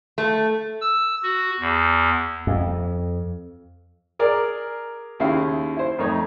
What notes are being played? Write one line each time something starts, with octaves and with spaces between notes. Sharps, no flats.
A3
E6
F#4
E2
F2
G#4 A#4 D5
D#2 C#3 E4 F5
E4 C5
F2 A3 D#4 C#5